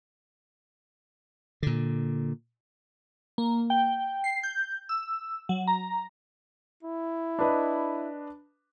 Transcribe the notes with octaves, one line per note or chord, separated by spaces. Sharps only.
A#2 D3
A#3
G5
C7
G6
E6
F#3
A#5
E4
D4 B4 D#5